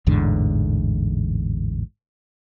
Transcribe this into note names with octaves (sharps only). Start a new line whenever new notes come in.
A1 E2 G#2 D3